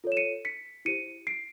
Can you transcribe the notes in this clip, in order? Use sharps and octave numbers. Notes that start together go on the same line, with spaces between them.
F4 A4 C#5
E7
C#7 D#7
B6 C#7
E4 G4 C5 C#7 D#7
C7 D7